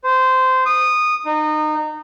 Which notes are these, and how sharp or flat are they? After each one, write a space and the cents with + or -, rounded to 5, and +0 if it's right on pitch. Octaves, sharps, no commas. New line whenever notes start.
C5 -15
D#6 -15
D#4 -25